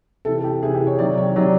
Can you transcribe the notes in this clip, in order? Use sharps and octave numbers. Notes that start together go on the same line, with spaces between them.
C3 E3 A4
G4
C3 E3 G#4
G4
C#5
C3 D#3 F#3 D5
C#5
C3 D#3 F#3 D5